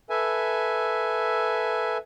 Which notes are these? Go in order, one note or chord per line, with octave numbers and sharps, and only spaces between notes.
A4 B4 E5 G#5